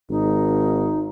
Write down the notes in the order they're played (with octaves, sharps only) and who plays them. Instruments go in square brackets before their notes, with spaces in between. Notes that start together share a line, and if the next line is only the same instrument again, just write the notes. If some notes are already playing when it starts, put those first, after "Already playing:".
[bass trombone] G#1 [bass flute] D#4